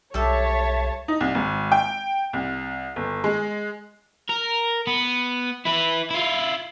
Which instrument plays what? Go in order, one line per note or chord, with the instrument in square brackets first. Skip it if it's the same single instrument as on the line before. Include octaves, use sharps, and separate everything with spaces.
[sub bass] B1 [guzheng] G3 A4 [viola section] C#5 A5 [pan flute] E5
[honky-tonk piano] D#4
C2
G#1
G5
C2
G1
G#3
[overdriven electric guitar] A#4
B3
E4 B4
E4 F4